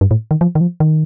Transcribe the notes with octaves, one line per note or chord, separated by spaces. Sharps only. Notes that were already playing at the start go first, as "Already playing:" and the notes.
G2
A2
D#3
F3
D#3
F3
D#3